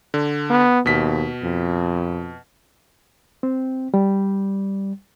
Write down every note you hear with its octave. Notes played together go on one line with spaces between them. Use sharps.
D3
B3
D#2 B2 B6
F2
C4
G3